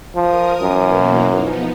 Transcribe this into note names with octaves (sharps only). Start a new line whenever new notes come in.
F3 A#4 D#6
F#2 B2 E3 A#3
F3 B3 D#4